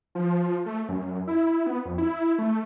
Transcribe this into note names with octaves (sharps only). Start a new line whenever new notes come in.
F3
A3
F#2
E4
B3
F2
E4
A3